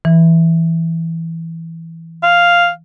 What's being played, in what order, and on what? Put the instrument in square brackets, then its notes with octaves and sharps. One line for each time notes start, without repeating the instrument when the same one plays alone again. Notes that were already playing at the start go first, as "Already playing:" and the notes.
[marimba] E3
[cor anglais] F5